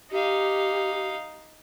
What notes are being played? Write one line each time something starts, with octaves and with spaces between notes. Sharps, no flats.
D#4 G4 F5